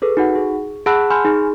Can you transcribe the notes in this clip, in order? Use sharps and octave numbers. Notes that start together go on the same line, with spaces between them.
G#4 A4 B4
D#4 F#4 F#5
G#4
G#4 F#5 A5 B5 E6 F#6
G#5 B5 C6 F6 G6
D#4 G#4